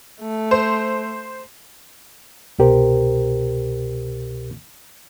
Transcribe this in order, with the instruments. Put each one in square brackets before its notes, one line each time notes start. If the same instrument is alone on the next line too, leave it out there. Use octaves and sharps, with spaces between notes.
[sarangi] A3
[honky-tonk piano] C5
[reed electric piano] C2 B2 G4 A#4 C5